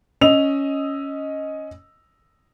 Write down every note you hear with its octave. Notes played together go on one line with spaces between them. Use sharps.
C#4 D#5 E6 F7